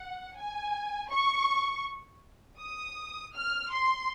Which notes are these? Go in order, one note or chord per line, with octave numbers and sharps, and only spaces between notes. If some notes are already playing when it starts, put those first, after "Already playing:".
Already playing: F#5
G#5
C#6
D#6
F6
C6